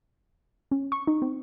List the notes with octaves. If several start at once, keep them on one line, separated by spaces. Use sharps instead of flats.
C#4
C#6
D#4
C4